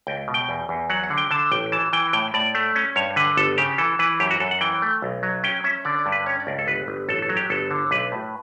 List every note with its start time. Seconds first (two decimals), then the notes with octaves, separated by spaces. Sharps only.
0.07 C#2 G5
0.28 B2
0.34 G5
0.49 E2
0.69 E2
0.90 F#3 F#5
1.03 F#5
1.10 D3
1.17 G5
1.31 D3 A5
1.51 A1 G5
1.72 E3 A5
1.93 E3 G5
2.13 A2 G5
2.34 A2 D5
2.55 A3
2.76 C#4
2.96 G2 C#5
3.16 D3 B4
3.37 G1 A4
3.58 C#3 G4
3.78 E3 A4
3.99 E3 B4
4.20 F#2 G4
4.31 F#4
4.40 F#2 A4
4.51 F#5
4.61 E3 G5
4.82 A3
5.02 B1
5.23 F#3
5.43 C#4 G5
5.64 C#4 E5
5.85 D3 D5
5.99 D5
6.06 G2
6.12 B4
6.26 C#4 C#5
6.40 D5
6.47 C#2
6.59 A4
6.67 G1 B4
6.88 G1
7.09 A1 A4
7.22 A4
7.29 F#3
7.37 G4
7.50 G1 A4
7.71 D3
7.91 B1 B4
8.12 A2